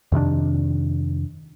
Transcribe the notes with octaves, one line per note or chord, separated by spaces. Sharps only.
F2 C3 D#3 D4